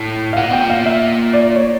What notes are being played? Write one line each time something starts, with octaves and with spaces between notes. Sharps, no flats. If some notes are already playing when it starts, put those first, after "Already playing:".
Already playing: A2
F5
A#2 F#5
B2 G5
A#2
F5
E5
D5
C#5